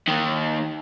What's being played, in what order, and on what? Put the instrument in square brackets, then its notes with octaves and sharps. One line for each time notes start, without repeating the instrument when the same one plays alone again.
[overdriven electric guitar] D#2 D#3